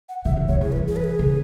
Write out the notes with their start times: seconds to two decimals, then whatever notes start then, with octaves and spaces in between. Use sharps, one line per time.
0.09 F#5
0.25 C#3 E5
0.37 C#3
0.48 C#3 C#5
0.61 E3 G#4
0.72 E3 B4
0.88 G#4
0.96 B4
1.04 G#4
1.19 C#3